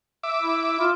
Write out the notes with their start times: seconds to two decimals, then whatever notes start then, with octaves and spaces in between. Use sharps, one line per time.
0.23 E5 D6
0.42 E4
0.80 F4